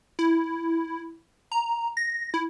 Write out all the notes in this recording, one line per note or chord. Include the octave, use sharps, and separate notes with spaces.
E4
A#5
A#6
E4